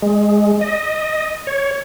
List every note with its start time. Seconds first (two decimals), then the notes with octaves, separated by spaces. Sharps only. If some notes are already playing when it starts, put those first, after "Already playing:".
0.02 G#3
0.61 D#5
1.47 C#5